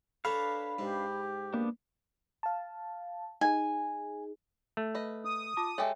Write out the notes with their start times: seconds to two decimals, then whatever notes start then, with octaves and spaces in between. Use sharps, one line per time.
0.25 D4 A4 B4 C#5 F5 A#5 B5
0.79 G#2 G4
1.54 A#3 B3 D4
2.43 F5 A5
3.41 D#4 G#4 G#5
4.77 A3
4.95 B4 D#5
5.25 D#6
5.57 F4 A5 D6
5.78 G#3 G4 A4 C#5 E5 G5